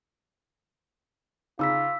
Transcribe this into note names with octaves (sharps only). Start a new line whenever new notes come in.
C#3 D#4 F4 G#4 D6 E6 B6